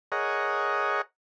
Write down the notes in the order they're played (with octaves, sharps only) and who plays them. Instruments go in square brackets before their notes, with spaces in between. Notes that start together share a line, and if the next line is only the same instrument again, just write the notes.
[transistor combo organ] G#4 A#4 C#5 D#5 F#5